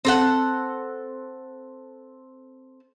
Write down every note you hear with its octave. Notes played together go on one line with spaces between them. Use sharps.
C4 A4 F#5